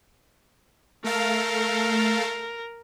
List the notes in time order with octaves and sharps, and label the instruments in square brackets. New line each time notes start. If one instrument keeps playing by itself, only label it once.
[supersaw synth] A3 A4 F5 [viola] A#4